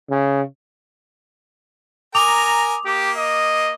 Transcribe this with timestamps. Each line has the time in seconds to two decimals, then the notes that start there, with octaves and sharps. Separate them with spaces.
0.10 C#3
2.15 A#4 G#5 A#5 D6 D#6 F7
2.86 A#3 G4
3.16 D#5